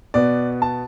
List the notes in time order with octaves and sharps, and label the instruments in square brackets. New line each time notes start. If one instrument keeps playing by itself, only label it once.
[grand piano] B2 B3 D5
A5